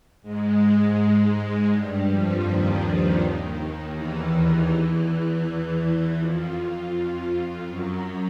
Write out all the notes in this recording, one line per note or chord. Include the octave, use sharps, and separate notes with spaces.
G#2 G#3
G2 G3
F2 F3
D#2 D#3
D#2 D#3
E2 E3
F2 F3
F#2 F#3